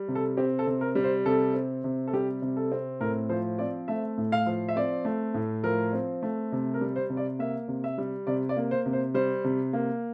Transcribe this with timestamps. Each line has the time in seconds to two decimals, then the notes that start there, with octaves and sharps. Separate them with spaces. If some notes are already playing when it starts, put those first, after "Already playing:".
Already playing: G3
0.08 C3
0.15 A4
0.37 C4 G4
0.59 A4
0.67 C3
0.81 A#4
0.95 G3
1.04 C5
1.26 C3 A4
1.54 C4
1.84 C3
2.08 A4
2.13 G3 G4
2.42 C3
2.57 A4
2.72 C4
3.01 A2 A#4
3.29 F3 C5
3.59 C4 D5
3.88 A3 E5
4.18 A2
4.32 F5
4.46 F3
4.68 E5
4.76 C4 D5
5.05 A3
5.34 A2
5.63 F3 A#4
5.93 C4
6.23 A3
6.52 C3
6.74 A#4
6.81 G3
6.96 C5
7.10 C3
7.17 D5
7.39 A#3 E5
7.68 C3
7.84 E5
7.98 G3
8.27 C3 D5
8.49 D5
8.57 A#3
8.71 C5
8.86 C3
8.93 C5
9.14 G3 C5
9.44 C3
9.73 A#3